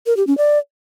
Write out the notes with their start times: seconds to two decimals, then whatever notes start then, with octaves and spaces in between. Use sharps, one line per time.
0.06 A#4
0.17 G4
0.27 C#4
0.38 D5